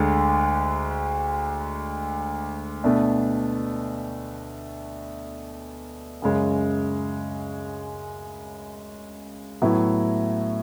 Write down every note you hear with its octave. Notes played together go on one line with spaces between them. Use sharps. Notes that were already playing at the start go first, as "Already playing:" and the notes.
Already playing: D2 D3 G#3
B2 A3 D4
F#2 C#3 G#3 C#4
A2 F#3 B3 E4